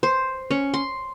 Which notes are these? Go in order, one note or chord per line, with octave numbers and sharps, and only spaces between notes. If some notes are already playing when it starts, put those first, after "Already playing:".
C5
C#4
C6